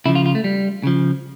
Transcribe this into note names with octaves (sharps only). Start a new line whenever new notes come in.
C#3 F3 E4
F4
F4
A3
G3
C#3 F3